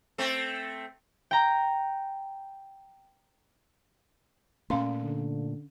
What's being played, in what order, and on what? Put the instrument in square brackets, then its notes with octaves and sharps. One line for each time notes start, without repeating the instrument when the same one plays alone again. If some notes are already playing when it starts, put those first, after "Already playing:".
[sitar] A3 C4 A4
[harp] G5 A#5
[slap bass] A#2 A3 [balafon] C#4 F5 C6
[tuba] D3